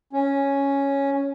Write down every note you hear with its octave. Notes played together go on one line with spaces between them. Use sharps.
C#4